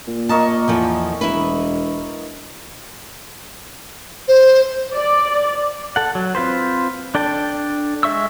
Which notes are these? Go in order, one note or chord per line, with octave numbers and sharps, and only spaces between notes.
A#2
A#3 D#5 A5 C#6
E2 F3 A4
E1 E4 B4
C5
D5
A4 F#5
F#3
C4 F4 B4 C5
D4 A4 G5 A5
G#3 D#5 E5 C#6 E6